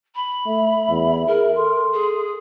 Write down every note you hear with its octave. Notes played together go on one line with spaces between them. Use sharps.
B5
A3 E5
E2
G#4 A#4
A4 C6
G#4